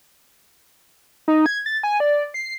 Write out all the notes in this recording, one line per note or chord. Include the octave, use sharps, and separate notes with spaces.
D#4
G#6
A6
G#5
D5
C7